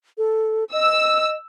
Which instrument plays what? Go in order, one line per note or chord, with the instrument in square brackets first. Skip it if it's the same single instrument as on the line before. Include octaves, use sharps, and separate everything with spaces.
[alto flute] A4
[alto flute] D#5 [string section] E6